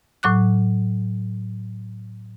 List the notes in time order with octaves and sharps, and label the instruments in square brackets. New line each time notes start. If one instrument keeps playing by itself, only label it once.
[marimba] A2 F#3 D6 F#6